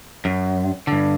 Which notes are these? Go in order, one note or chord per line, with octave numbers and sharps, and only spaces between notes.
F#2
G2 D3